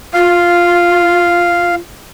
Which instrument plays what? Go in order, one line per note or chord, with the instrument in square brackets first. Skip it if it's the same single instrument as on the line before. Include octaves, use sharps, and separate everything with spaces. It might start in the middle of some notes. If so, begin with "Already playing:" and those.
[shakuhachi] F4 [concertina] F5